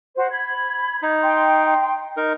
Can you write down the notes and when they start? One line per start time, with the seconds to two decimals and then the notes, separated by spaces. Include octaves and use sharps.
0.16 F#4 C5
0.30 B5 G#6
1.03 D#4
1.22 G5 C6
2.17 D#4 A#4